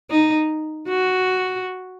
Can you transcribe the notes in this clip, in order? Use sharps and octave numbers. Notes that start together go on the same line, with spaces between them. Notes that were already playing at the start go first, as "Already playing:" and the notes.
D#4
F#4